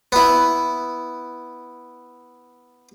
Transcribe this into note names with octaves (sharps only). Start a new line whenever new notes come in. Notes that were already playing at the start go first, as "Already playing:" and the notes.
B3 E4